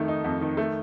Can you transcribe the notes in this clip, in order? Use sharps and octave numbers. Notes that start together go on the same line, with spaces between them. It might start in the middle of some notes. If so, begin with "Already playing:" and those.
Already playing: F2 D#3 A3
D#4
F2
D#3
A3